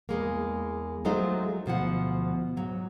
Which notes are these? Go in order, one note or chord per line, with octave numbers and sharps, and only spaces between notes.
E2 G#3 A#3
F#3 G#3 A3 D#4 F4 C5
D2 B2 F3 F#5
G#2 F#3